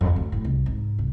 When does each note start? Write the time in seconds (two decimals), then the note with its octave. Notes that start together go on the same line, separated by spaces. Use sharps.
0.01 F2
0.16 D2
0.32 A2
0.45 C2
0.66 G#2
0.98 C2